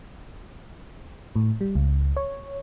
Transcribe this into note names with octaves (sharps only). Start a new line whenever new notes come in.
A2
G3
C#2
C#5